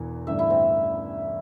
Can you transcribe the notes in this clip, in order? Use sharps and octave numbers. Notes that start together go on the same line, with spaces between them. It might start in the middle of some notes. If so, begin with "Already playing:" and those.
Already playing: E1 E2 E3
A1 G2 D3 A3 E5
E4
C4